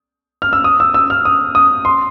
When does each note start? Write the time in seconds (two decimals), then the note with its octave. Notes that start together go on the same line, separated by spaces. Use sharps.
0.42 F6
0.53 E6
0.64 D#6
0.80 E6
0.94 E6
1.10 F6
1.25 D#6
1.55 D#6
1.85 C6